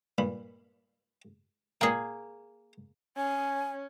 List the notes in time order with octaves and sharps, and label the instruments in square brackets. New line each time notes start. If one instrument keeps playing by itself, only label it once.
[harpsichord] G2 A#2 B5
[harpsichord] A#2 G5 [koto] A#3 G#4
[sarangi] C#4 [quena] G#5